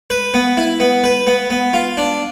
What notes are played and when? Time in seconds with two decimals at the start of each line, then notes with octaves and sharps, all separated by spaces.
0.10 B4
0.34 B3
0.57 E4
0.80 B3
1.04 B4
1.27 B3
1.50 B3
1.73 F4
1.97 D4